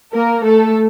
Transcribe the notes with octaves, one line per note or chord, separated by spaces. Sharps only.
A#3 A#4
A3 A4